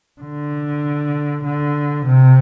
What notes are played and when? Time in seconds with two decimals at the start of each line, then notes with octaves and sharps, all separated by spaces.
0.22 D3
1.45 D3
2.05 C3